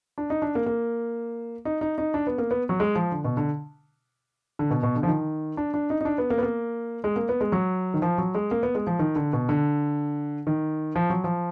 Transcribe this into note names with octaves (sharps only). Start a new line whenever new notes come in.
D4
D#4
D4
A#3
A#3
D#4
D#4
D#4
D4
B3
A#3
B3
F#3
G#3
F3
D3
B2
D3
D3
B2
B2
D3
F3
D#3
D4
D4
D#4
D#4
D4
B3
A#3
B3
A#3
G#3
A#3
B3
G#3
F#3
D#3
F3
F#3
G#3
A#3
B3
G#3
F3
D#3
D3
B2
D3
D#3
F3
F#3
F3